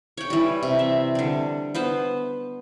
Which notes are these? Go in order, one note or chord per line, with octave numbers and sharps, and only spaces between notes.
C#5 G5
E3 G3
C3
E5
D3 G3
B3 B4 C5